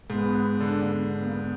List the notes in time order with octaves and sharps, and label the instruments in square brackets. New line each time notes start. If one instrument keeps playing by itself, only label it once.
[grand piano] G#2 [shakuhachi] B3
[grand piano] D3 [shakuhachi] D4
[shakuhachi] A#3
B3
D4
B3
A#3
B3